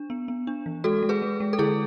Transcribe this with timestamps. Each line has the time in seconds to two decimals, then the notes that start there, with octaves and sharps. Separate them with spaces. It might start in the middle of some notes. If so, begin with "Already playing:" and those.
Already playing: D4
0.10 B3
0.28 B3
0.47 D4
0.66 E3
0.84 G#3 F#4 A4
1.03 G#3
1.09 G#4 B4
1.22 G#3
1.40 G#3
1.53 A4
1.59 D3 E4 G#4